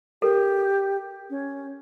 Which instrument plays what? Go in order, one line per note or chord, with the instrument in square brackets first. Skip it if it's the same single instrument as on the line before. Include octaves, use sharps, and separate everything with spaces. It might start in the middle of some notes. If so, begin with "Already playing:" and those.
[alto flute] G4 [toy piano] A4 A#4
[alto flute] C#4